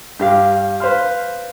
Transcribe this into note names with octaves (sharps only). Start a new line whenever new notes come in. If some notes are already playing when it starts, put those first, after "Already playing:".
G2 G4 F5
B4 C5 F5 C6 F6